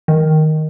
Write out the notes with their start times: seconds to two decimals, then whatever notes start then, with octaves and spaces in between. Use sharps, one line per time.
0.08 D#3